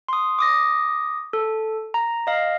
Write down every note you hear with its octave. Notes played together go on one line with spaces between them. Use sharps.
C6 D#6
D6 D#6 A#6
A4
A#5
D#5 F5